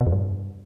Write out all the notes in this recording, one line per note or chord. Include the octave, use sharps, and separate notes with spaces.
B2
F2
G2